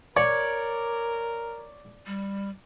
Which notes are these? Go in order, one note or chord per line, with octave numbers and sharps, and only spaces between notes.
A#4 C#5 D5
G3